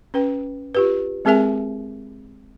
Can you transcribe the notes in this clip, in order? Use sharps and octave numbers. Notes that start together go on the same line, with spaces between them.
C#4 B4 G5
F4 G4 B4
G#3 C4 G#4 A#4 E5 G#5